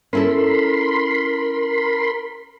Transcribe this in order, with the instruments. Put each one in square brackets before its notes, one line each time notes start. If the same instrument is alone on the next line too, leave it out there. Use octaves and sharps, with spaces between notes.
[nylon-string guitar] C#4 E4 A4 [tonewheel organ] A#4 B5 C6